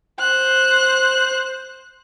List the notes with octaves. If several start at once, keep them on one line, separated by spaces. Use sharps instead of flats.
C5 F#6